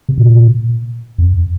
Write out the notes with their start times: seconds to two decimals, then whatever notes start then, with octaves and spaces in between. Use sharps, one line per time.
0.09 C3
0.18 A#2
1.18 F2